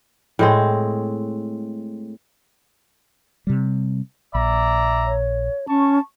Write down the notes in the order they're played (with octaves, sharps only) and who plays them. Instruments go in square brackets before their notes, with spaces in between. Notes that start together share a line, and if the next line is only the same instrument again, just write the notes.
[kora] A2 G#3 C4
[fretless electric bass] C3 G3
[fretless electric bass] A#1 [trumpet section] D5 E5 A#5
[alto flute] C#5
[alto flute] C#4 [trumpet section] A5 C#6